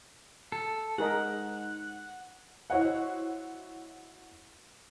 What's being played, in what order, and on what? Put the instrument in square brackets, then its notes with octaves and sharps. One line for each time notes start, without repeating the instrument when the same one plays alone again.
[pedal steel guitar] A4
[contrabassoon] G#2 [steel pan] G#4 A#4 D#5 [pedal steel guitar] F#5
[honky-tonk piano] E4 F#4 C5 C#5 D#5 F#5